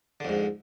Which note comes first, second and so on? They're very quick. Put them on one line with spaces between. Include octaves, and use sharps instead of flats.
D3 F2 G#2